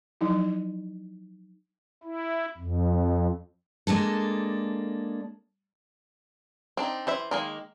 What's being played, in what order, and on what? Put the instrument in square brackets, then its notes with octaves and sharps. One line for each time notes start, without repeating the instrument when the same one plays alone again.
[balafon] F3 F#3 D#4 E4
[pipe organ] E4
F2
[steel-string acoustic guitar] G#3 A#3 D4 A4
[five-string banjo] C4 D4 D#4
E3 C5 E5
D#3 G#3 A#3